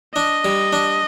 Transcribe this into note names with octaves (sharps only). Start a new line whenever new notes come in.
D4 D#5
G3
D4